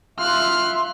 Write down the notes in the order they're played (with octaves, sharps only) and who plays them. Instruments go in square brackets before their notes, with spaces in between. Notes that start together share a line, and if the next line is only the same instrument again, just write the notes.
[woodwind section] F4 E5 C6 [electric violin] F6 F#6